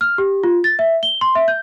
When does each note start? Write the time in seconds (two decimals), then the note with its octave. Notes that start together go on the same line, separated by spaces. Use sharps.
0.01 F6
0.18 G4
0.43 F4
0.64 A6
0.79 E5
1.03 G7
1.21 C6
1.35 E5
1.48 G6